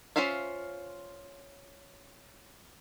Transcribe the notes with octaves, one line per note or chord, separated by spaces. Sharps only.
C#4 F4 C5 E5 F5